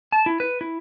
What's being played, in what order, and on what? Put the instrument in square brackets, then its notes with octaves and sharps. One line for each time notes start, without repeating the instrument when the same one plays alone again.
[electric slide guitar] A5
E4
B4
E4